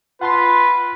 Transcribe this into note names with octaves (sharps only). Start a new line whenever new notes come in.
F4 B4 F#5 A5 C6